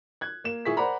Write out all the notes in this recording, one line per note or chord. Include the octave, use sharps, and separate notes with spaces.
F#6 G#6
A#3 E7
A#2 E4 G#4 C#6 B6
A#4 C5 D5 F#5 A#5 B5